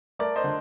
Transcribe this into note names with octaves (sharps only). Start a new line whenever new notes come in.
A3 A#4 D5
C5 D#5
D3